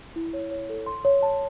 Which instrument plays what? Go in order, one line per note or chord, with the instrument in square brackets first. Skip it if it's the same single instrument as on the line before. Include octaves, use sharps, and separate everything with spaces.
[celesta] E4
C#5
C#5
A4
C6
C#5
A5